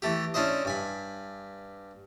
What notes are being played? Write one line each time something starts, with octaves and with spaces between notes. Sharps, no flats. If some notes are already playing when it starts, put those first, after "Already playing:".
E3 A3 G4
C#4 D4 E4 C5 D#5
G2 G#5 B5